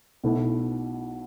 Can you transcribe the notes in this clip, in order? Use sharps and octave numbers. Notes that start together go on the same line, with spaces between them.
B1 B2 A3 E4